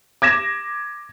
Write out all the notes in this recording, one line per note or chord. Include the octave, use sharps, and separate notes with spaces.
D6 G#6 A#6 E7